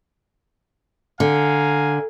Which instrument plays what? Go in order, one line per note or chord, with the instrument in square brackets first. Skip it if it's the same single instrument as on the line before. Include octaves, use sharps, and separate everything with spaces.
[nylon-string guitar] D3 [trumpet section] F5 G#5 A#5